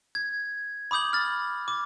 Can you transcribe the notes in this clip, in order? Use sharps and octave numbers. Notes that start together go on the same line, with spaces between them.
G#6
B5 D6 D#6 G6 F#7
F6 A6
D6